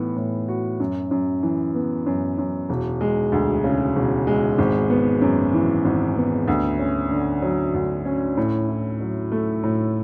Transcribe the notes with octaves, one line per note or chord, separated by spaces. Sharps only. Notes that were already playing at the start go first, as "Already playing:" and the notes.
Already playing: A2 E3 B3
A2
F#4
F#2
F#2
E3
B3
F#2
F#2
E1
G#3
D2
C#3
E1
G#3
G#1
B3
F#2
E3
G#1
B3
D2
C#4
D3
F#3
D2
C#4
A2
E4
F#3
A3
A2